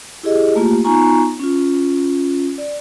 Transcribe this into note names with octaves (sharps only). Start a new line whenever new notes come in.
E4 G4 G#4 D#5
A3 A#3 F4 G4
B3 D#4 F4 G#5 A#5 C#6
C#4 F4
D5